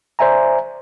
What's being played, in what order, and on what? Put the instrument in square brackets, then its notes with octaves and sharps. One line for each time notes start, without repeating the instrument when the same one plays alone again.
[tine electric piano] C5 D5 E5 G#5 A#5